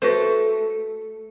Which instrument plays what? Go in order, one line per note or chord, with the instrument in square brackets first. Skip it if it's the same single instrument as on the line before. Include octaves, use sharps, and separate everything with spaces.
[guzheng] A3 [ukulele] F#4 B4 C5